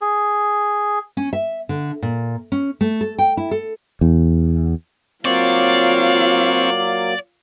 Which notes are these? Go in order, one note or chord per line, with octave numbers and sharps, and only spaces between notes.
G#4
C#4
E5
D3
A#2
C#4
A3
A4
G5
E4
A4
E2
F#3 A#3 C4 F4 C#5 D5 F5